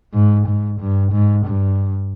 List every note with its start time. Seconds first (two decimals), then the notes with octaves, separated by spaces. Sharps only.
0.14 G#2
0.47 G#2
0.81 G2
1.12 G#2
1.45 G2